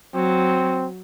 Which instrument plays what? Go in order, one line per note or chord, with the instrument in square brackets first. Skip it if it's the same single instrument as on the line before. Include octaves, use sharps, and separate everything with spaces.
[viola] F#3 [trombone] C4